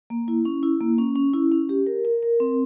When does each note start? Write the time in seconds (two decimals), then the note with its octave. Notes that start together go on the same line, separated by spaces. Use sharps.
0.10 A#3
0.28 E4
0.45 C#4
0.63 E4
0.81 A#3
0.98 C#4
1.16 C#4
1.34 E4
1.52 C#4
1.69 G4
1.87 A#4
2.05 A#4
2.23 A#4
2.40 C4